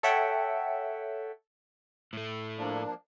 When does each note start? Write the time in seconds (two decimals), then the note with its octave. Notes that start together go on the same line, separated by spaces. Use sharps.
0.03 A4 C#5 E5 F#5 G5
2.13 A2 A3
2.58 F3 A#3 D4